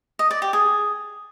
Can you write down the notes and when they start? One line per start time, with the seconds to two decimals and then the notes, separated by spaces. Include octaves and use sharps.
0.19 D#5
0.31 D5
0.42 G4
0.53 G#4